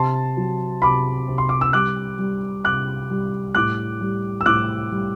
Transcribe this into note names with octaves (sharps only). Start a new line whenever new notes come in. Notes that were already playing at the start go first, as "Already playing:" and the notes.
Already playing: C3 A5 C6
F#3
C3 B5 D6
C3
C6
D6
E6
G3 D6 F#6
G3
C3 D6 F#6
G3
A2 D6 F#6
G3
E6
A2 D6 F#6
G3